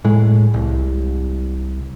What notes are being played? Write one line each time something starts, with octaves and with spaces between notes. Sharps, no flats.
A2 G#3
C2